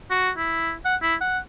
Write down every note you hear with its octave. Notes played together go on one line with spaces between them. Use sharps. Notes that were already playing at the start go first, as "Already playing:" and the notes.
F#4
E4
F#5
E4
F#5